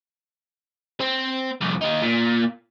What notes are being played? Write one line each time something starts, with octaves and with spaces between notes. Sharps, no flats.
C4
C2 F2
A#3 D#4
A#2